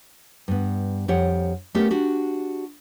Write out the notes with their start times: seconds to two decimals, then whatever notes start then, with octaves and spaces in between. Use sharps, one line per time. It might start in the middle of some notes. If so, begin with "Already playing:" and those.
0.48 G2 B3
1.08 F2 G4 C#5 F#5
1.75 A3 B3 C#4 G4 A#4
1.90 D4 F#4 G4